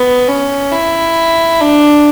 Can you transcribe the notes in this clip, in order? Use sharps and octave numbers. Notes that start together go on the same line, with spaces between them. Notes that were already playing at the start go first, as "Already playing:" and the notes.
Already playing: B3
C#4
E4
D4